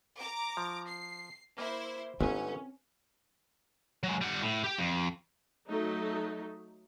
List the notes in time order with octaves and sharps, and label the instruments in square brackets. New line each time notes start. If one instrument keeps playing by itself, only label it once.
[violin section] A#5 D6
[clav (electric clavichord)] F3
[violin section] C7
[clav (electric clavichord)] A#3 [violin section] E4 C5
[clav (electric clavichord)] G1 G#2 E5 [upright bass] C4 [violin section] C#4
[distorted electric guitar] F#3 G#3
G3 F#5
A2
G4 G5
F2
[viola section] F#3 A3 D#4